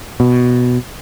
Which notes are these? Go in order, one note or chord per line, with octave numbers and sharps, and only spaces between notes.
B2